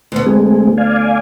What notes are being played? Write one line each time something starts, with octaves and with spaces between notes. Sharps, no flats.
D2 B3
G#3 C4 G#4
D5 F5 G#5